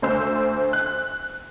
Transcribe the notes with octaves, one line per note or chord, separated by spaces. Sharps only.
D2 C5 E6
F#6